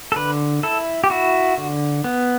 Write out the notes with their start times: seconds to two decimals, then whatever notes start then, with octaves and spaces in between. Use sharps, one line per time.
0.12 A4
0.16 D3 B4
0.63 E4 A4
1.04 G4
1.10 E4 F#4
1.58 D3
2.04 B3